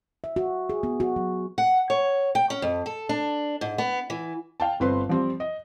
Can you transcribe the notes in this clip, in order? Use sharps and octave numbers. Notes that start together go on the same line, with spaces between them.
E5
F#4
G#4
B3
F#4
F#3
F#5
C#5
G5
C#4
F2
A4
D4
G#2
B3
E3
F5 G5 A5
G1 C4 B4 C6
F3 G3 C4
D#5